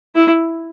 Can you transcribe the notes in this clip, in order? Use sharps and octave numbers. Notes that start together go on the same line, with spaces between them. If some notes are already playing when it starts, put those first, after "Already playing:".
E4